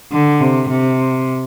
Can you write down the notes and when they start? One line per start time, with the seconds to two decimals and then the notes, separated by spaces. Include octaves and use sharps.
0.12 D3
0.40 C3
0.69 C3